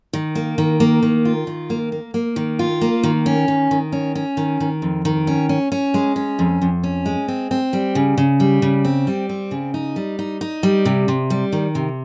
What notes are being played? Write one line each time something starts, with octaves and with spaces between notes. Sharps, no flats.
D#3
A#3
D#3
A#3
D#3
F4
D#3
A#3
A#3
A#3
D#3
F4
A#3
D#3
C#4
D#3
D#3
C#4
C#4
D#3
D#3
F2
D#3
C#4
C#4
C#4
G#3
C#4
F2
F2
C#4
G#3
C4
C4
G3
C#3
C#3
G3
C#3
C4
G3
C4
C#3
D#4
G3
D#4
D#4
G3
C3
C3
G3
D#3
C3